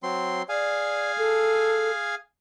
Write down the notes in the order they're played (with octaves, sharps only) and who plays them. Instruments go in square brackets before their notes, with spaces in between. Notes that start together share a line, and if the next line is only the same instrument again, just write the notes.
[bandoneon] F#3 C4 C6
[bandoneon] G#4 F5 G#5 [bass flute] D5
[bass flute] A4